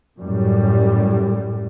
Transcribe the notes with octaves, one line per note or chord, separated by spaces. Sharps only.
F#2 A2 G3